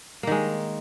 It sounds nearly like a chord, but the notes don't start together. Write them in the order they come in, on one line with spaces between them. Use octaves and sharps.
A#3 D#3 G#3